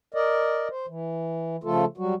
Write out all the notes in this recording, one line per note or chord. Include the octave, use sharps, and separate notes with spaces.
A#4 D5 D#5
C5
E3
C#3 F3 A3 F4 A4
F#3 G3 F#4